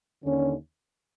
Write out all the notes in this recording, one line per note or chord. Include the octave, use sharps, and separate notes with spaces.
D#2 D3 C#4